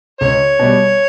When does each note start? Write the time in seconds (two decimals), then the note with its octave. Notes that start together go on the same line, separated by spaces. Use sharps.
0.21 C#2 C#5
0.59 B2 G3